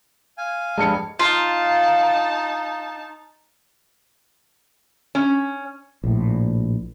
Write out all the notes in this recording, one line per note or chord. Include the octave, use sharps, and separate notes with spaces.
F5 G#5
F1 G2 G#3 A5 B5 C#7
D#4 F4 A5
C#4
A#1 A2